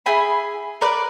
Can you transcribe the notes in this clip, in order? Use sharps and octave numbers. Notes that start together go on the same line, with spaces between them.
E4 G#4 G#5 B5
A#4 B4 D5